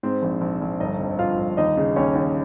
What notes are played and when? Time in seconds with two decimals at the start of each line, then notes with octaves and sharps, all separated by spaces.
0.03 G#2 C4 C5
0.22 A#1
0.41 A#1
0.61 A#1
0.80 G1 D#4 D#5
1.00 F2
1.19 G1 F4 F5
1.38 G1
1.57 D#2 D#4 D#5
1.77 C#3
1.96 D#2 C#4 C#5
2.15 D#2